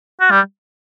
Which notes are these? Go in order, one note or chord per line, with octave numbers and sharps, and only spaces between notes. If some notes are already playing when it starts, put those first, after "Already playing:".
F#4
G3